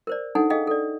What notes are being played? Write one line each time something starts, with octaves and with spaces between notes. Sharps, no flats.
A#4 C5 D5
D4 D#4 A4 F#5 G#5
G#4 A4 D#5 F5 G5
A4 D5